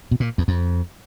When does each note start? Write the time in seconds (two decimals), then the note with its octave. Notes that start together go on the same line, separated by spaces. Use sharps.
0.11 B2
0.20 A#2
0.38 E2
0.48 F2